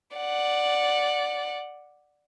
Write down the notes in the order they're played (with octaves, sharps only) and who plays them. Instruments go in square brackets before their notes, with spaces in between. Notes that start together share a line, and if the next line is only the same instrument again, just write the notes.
[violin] D5 F#5